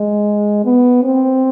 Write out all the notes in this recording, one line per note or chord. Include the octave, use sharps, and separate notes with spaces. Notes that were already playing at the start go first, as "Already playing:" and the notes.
Already playing: G#3
B3
C4